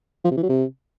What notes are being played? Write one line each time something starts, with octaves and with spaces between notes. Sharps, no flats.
F3
C3
E3
F#3
C3